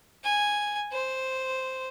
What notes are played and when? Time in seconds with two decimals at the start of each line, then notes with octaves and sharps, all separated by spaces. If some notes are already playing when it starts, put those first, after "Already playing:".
0.24 G#5
0.93 C5